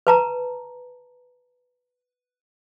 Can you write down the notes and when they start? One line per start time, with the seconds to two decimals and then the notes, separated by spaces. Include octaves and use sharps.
0.07 B4 A5 A#5